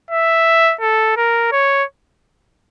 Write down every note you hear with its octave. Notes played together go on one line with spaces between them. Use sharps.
E5
A4
A#4
C#5